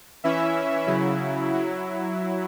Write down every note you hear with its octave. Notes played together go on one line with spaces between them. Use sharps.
E3 C#4 E4 E5
C#3 F#3 E4
F#3 E4